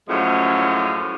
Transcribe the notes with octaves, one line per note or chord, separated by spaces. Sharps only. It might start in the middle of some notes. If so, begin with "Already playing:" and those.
F#2 A2 F3 G#3 C#4